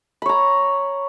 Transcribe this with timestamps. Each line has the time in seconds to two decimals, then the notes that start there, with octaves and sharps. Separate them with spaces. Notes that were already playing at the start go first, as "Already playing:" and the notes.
0.22 B5
0.26 C#5
0.29 A#5